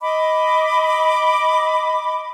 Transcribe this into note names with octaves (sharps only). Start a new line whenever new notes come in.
D#5 B5 D6